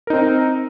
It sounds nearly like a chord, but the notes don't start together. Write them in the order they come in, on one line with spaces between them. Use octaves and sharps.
A#4 D#4 C4